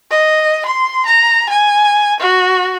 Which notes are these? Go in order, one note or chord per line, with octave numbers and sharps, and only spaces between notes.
D#5
C6
A#5
G#5
F#4